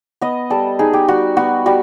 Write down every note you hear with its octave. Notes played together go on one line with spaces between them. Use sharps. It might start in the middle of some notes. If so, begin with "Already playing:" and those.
B3 D#5
G3 A4
D#4 G#4
G4
G3 F#4
B3 F#4
G3 F#4